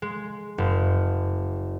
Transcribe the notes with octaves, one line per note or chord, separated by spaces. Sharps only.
G#3
F#1